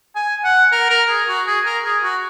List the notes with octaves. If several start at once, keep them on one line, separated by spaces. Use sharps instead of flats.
G#5
F#5
A#4
A#4
G#4
F#4
G#4
A#4
G#4
F#4